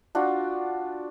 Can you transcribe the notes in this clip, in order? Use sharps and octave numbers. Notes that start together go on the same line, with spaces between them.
D4 F4 F#4